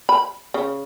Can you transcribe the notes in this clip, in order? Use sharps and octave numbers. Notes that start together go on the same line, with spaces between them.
B5
C#3